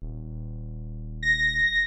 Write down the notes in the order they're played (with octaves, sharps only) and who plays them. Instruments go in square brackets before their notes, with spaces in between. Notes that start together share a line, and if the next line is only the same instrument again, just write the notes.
[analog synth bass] D#1
[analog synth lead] A#6